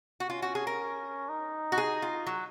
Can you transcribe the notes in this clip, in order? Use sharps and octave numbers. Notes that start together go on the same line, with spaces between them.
F#4
C#4 F4
F#4
G#4
A#4
D#4
F#4
G#4
F4
F#3